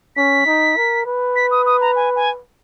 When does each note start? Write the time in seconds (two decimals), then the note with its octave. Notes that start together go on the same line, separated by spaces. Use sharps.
0.16 C#4 B6
0.47 D#4
0.77 A#4
1.06 B4
1.36 B6
1.51 D#6
1.66 D#6
1.81 A#5
1.96 G#5
2.16 G#5